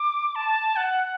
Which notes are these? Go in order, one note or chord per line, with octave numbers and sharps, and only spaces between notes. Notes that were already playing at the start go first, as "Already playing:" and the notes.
Already playing: D6
A5
F#5